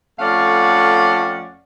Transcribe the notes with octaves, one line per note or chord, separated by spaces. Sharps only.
F2 A3 C#4 D5 F5 F#5